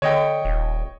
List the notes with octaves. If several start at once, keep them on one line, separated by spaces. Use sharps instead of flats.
D3 C#5 D#5 G5
D#1